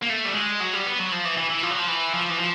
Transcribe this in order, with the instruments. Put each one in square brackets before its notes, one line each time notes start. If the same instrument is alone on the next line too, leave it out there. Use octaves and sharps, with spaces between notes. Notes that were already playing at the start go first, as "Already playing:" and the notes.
[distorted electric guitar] A#3
A3
G3
G#3
F#3
G3
B3
F#3
F3
E3
E3
E3
F3
F#3
F3
E3
F3
E3
F3